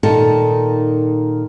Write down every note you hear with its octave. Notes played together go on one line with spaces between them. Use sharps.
A#2 D#3 D#4 A4 A5